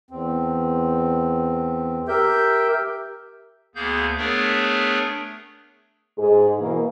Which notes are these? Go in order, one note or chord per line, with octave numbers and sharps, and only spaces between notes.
E2 C4
G4 A#4 E5 G5 G6
D2 A#3 B3 G#4 G6
A3 B3 D4 G#4 A#4 C#5
G#2 G#4
B2 E3 A#3